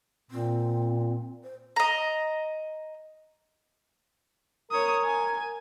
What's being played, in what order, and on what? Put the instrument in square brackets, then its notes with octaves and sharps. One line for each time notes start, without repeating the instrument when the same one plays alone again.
[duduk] A#2 [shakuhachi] C4
[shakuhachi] C5
[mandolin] D#5 A#5
[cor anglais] A#4 [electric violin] C#5 D#6
[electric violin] G#5